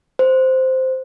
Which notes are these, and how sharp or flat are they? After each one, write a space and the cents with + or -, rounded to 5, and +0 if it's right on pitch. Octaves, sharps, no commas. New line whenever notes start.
C5 -5